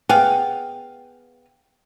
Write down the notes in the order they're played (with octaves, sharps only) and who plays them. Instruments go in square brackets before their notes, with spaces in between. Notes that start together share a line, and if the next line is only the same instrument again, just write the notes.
[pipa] B3 G#4 F5 [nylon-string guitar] G5